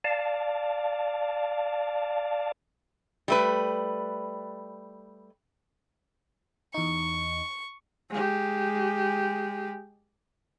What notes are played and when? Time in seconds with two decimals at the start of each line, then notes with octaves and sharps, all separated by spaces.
0.04 D5 F5 A5
3.28 G3 A3 B4
6.74 E2 D#4 C#6
8.10 G#3 G4